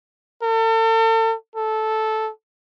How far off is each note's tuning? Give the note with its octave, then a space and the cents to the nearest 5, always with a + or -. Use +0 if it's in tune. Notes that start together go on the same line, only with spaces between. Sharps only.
A4 +40
A4 -10